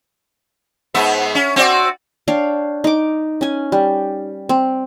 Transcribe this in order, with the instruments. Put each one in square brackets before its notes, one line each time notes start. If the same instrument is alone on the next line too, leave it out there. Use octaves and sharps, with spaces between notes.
[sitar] G#2 B3 E5
C#4
C4 F#4 D5
[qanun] D4 C#5 F5 G5
D#4 D6
C#4 G#5
G3
C4